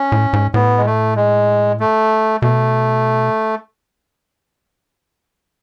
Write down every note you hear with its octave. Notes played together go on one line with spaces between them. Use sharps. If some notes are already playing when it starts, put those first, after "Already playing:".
Already playing: C#4
A2
G#2
A2 B3
G#3
A3
G#3
A3
B2 A3